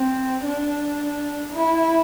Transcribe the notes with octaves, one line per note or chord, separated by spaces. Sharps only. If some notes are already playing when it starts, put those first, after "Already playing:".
Already playing: C4
D4
E4